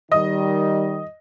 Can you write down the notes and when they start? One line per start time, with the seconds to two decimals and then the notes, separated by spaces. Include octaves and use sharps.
0.12 D#3 G3 D#5 D#6